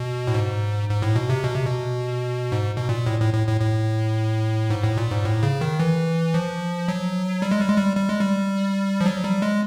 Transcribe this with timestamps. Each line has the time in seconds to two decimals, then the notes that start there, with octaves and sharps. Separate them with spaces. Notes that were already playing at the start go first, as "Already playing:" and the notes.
Already playing: B2
0.27 A2
0.34 G#2
0.89 G#2
1.02 A2
1.16 B2
1.30 C3
1.44 B2
1.54 C3
1.66 B2
2.52 G#2
2.77 B2
2.89 A#2
3.06 A2
3.20 A2
3.34 A2
3.48 A2
3.61 A2
4.70 G#2
4.83 A2
4.97 A#2
5.11 G#2
5.25 A2
5.43 C#3
5.61 D#3
5.80 E3
6.34 F3
6.88 F#3
7.42 G3
7.51 G#3
7.60 G3
7.69 G#3
7.78 G3
7.97 G3
8.09 G#3
8.21 G3
9.01 F3
9.06 F#3
9.24 G3
9.42 G#3